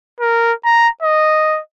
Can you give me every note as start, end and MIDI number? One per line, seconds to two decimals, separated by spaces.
0.20 0.53 70
0.65 0.88 82
1.02 1.60 75